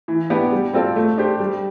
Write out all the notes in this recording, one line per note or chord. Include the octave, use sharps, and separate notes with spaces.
E3
B3 D4 G4
G3
C4 F4 A4 D5
A3
D4 G4 C5
G3